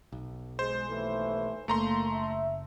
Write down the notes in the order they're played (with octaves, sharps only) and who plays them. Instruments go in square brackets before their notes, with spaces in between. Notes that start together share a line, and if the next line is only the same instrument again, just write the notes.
[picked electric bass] B1
[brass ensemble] G#3 [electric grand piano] C5
[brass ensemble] D#2 E3 A3
[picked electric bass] F#1 [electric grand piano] A3 A#5 C6 [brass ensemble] A#3
[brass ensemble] E5